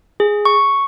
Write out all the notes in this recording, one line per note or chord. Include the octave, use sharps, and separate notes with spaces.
G#4
C#6